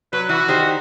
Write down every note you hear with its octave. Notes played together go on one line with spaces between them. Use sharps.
F#3 B4
E3 F#4
D#3 G4 C5